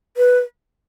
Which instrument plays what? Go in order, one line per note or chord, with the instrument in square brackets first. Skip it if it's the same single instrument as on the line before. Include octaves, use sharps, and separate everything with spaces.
[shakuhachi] B4